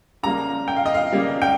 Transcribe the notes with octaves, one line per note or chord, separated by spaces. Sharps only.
C#3 G3 A#3 A#5
G5
F5
D#5
F5
C#3 G3 A#3
G5